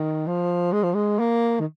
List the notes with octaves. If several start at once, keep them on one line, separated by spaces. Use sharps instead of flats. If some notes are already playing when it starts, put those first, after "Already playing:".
Already playing: D#3
F3
G#3
F3
G#3
A#3
D#3